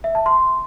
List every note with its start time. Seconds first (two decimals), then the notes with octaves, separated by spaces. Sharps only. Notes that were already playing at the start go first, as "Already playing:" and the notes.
0.04 E5
0.15 A5
0.26 C6